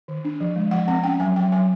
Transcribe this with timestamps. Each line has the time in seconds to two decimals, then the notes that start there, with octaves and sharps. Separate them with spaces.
0.08 D#3
0.25 D4
0.41 F3
0.56 G#3
0.71 F3 F#5
0.88 C4 F#5
1.04 C#4 G5
1.20 F#3 G#5
1.36 F#3 G5
1.52 F#3 G#5